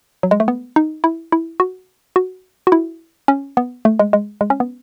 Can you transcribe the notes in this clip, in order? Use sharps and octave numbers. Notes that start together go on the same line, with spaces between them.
F#3
G#3
A3
B3
D#4
E4
E4
F#4
F#4
F#4
E4
C#4
B3
A3
G#3
G#3
G#3
C#4
B3